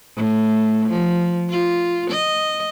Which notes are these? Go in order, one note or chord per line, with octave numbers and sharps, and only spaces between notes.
A2
F3
F4
D#5